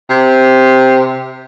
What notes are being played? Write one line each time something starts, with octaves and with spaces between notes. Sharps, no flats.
C3